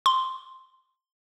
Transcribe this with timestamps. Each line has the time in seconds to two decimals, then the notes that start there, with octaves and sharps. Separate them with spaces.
0.06 C6